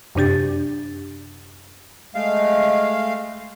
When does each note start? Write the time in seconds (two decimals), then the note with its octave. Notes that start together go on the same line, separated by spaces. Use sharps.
0.15 F#2 C3 D4 G4 A6
2.15 G#3 A3 F5